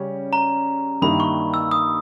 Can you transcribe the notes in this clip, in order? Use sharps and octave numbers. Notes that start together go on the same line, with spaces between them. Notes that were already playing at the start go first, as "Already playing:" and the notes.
Already playing: C#3 G3 C#4
A#5
G2 D#3 G3 A#3 E4 B5
C#6
E6
D#6